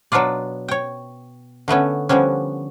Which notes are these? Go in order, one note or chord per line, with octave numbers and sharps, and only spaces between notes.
B2 F#3 B3 D4 F4 D5
C#5 G5
D3 A3 B3 C#4
D3 F3 G3 B3 C#4